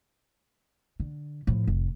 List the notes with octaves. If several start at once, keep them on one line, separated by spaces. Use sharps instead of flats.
D3
A2 F3
F1